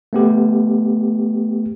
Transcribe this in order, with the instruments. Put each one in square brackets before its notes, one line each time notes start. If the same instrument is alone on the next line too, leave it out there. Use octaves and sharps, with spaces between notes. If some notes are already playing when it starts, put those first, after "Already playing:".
[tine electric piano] A3 B3 G4